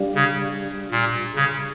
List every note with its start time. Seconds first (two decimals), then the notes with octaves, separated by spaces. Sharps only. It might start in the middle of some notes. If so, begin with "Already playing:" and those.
Already playing: G3 D4 G4 D5 F5
0.15 C#3
0.91 A#2
1.35 C#3